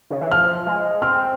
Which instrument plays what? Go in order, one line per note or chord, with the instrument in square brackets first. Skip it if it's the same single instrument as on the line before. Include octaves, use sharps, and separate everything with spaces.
[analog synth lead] C#3
E3
[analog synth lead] F3 [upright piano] F6
[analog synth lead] G#3
[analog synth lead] C4 [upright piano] F6